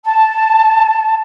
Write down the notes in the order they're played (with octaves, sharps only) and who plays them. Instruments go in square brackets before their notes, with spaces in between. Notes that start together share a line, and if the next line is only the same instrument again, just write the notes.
[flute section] A5